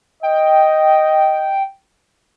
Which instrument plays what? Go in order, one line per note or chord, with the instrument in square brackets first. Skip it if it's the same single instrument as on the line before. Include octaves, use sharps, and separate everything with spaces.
[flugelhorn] D#5 [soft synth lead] G5